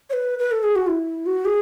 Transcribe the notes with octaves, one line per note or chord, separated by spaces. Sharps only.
C#5
B4
B4
A4
G#4
F#4
E4
F#4
G#4